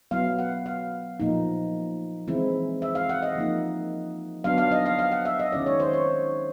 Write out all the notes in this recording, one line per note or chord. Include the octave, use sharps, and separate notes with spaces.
F#3 B3 E4 F5
F#5
F5
A#2 F3 A#3 D#4
E3 G#3 C4 E4
E5
F5
F#5
D#5
F3 A#3 D#4
F#3 B3 D4 F5
F5
D#5
F5
F5
F#5
E5
D#5
D#3 G#3 C#4 E4 D5
C#5
C5
C#5